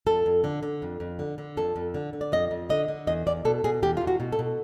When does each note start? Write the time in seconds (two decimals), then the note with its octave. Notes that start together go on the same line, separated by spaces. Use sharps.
0.06 F2 A4
0.26 F2
0.44 D3
0.63 D3
0.82 F2
1.00 F2
1.19 D3
1.38 D3
1.57 F2 A4
1.76 F2
1.94 D3
2.13 D3
2.21 D5
2.32 F2 D#5
2.51 F2
2.70 D3 D#5
2.88 D3
3.07 E2 D#5
3.27 E2 D5
3.45 B2 A4
3.64 B2 G#4
3.82 E2 G4
3.97 E2 F4
4.07 F#4
4.20 B2
4.32 A4
4.39 B2